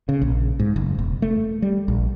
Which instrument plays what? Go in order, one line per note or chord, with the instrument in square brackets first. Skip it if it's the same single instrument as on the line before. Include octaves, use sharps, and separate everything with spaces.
[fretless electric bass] C#3
A#1
G#2
F#1
E1
A3
G3
A#1